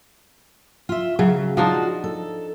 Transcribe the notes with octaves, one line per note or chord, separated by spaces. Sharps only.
F4 E5
C#3 F#3
F3 D4 D#4 F4 F#4
A4